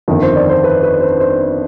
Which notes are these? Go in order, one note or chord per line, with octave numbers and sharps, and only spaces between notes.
G1 F2 D#3
C5
D5
C5
B4
B4
C5
C5